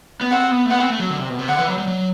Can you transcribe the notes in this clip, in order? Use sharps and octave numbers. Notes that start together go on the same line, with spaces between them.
B3
C4 F#5
B3
A3
B3 F#5
C4
A3
F#3
D3
C3
B2
C3
D3 F#5
E3
F#3
G3
F#3